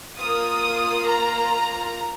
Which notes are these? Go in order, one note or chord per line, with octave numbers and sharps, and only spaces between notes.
A#3 F4 D#6
A#5